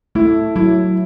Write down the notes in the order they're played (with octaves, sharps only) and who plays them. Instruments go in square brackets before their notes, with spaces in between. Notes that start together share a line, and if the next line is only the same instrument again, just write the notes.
[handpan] A3 [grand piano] E4
[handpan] F#3 [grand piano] E4